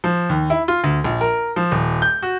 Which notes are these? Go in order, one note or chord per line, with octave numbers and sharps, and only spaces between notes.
F3
D#2
E4
F4
D2
A#1
A#4
F3
D#1
G6
F#4